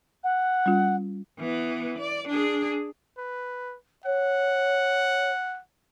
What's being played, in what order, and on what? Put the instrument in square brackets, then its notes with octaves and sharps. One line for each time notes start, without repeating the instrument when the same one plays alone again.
[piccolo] F#5
[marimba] G3 C#4 F4
[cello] E3 B3
D5
D4 G#4
[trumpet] B4
[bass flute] C#5 [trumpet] F#5